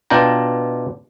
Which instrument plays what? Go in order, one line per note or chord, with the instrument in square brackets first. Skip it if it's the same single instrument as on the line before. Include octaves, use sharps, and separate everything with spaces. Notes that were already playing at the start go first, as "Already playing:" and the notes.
[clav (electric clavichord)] B2 D4 F4 G5 A#5